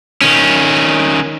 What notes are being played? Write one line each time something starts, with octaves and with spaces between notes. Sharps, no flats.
D#3 C#4